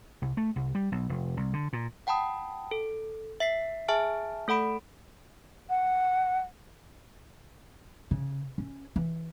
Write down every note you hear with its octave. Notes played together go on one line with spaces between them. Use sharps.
C2
A3
C2
G3
B1
F1
C2
D3
A#2
F#5 G5 A5 B5 D#6
A4
E5 B6 C7
G#4 E5 G#5 A5 F6 D7
A3 A4 F#5 B5 D7
F#5
C#3
C#4
E3